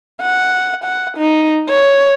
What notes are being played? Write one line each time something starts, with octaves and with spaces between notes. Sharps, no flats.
F#5
F#5
D#4
C#5